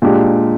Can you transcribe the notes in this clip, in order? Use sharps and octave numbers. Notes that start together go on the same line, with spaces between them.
A#2 G#3 D4 G4